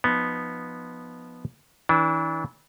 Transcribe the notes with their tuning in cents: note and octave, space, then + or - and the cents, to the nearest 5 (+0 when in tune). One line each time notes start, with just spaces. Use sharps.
F3 +0 B3 -5 D#4 -10
E3 -30 D4 -30